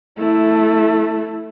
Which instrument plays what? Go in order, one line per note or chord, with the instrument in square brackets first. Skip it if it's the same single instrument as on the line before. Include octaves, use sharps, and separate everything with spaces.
[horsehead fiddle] A3 E4